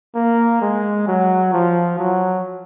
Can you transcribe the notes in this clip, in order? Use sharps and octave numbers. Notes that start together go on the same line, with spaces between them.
A#3
G#3
F#3
F3
F#3